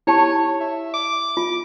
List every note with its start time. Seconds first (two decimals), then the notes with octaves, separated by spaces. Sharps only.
0.07 E4 G4 C#5 A5
0.60 E5
0.94 D6
1.37 F4